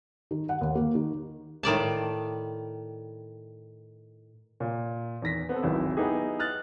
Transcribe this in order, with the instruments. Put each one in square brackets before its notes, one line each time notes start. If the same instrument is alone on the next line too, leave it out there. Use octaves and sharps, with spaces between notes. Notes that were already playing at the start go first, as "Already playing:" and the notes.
[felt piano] D#3
F#5
D#2
A#3
D#3
[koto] A2 D#3 D5 A5
[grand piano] A#2
E2 D#3 A#6 B6
B3 C4 A4
D1 G#1 D#3 E4
B3 D#4 E4 G4 G#4
D#6 F6 F#6 A6